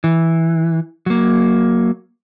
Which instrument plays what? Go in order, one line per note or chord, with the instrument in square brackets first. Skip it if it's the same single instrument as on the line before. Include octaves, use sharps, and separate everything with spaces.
[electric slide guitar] E3
F#3 A#3